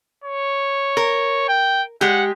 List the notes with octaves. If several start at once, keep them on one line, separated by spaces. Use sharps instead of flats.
C#5
A#4
G5
G#3 G4 F#5